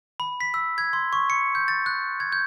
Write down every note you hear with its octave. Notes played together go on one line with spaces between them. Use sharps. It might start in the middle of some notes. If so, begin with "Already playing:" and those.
B5
B6
E6
G#6
C6
C#6
C#7
G6
A6
F#6
G#6
G6